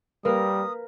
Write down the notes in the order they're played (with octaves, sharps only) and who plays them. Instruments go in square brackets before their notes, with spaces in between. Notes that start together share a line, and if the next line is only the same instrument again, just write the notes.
[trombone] G3 [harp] A#3 A#4 B4 [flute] D#6